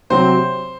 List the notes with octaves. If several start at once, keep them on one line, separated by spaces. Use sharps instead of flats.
C3 F#3 C4 C5